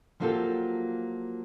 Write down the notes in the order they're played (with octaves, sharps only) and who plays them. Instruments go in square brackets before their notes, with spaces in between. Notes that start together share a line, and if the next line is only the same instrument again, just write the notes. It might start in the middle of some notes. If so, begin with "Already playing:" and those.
[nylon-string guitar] F3 F#3 A#3 F4 G4 A4